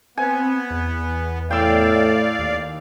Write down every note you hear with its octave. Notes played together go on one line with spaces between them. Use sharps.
B3 C4 G#5
E2
A2 D5 F5 G5 E6
D#2